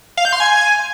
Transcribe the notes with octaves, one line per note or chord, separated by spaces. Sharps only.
F5
G6
C6
G#5